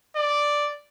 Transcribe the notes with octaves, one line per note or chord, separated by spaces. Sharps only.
D5